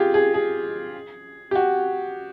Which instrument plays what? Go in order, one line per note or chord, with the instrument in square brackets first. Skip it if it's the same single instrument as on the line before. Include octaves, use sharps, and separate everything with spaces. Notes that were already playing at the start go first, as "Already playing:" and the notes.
Already playing: [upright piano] F4 G4 G#4
G#4
G#4
G4
F#4